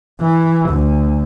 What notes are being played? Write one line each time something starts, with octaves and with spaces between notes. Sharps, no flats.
E3
D2